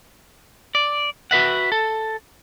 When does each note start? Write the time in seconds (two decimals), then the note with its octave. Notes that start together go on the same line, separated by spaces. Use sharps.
0.75 D5
1.31 F#4 B4 E5 F#5
1.72 A4